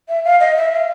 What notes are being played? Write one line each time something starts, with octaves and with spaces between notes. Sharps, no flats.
E5
F5
D#5
E5
F5